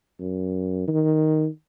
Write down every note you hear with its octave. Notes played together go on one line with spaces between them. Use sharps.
F#2
D#3